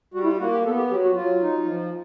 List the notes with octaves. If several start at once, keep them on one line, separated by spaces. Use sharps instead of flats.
G3 F#4
E4
F4
A#3 F#4
G4
B3 A4
G4
F#3 G4
F#4
F#3 F4
D#4
F3